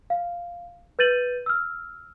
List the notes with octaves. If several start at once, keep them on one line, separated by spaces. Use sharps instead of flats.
F5
B4 G6 A6 D#7 F#7
E6 F6